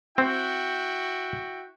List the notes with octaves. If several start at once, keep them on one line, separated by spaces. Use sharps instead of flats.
C4 E4 F#4 G5